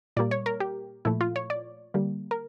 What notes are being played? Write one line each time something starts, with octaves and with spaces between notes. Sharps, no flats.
A#2 G3 A#3 D5
C#5
A#4
G4
A#2 F3 A3 E4
F4
C#5
D5
D3 G3 A#3
A#4